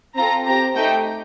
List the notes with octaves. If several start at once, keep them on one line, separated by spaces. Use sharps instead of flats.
C4 F4 A4 A#5
C4 G4 A#5
A3 D#4 G4 G5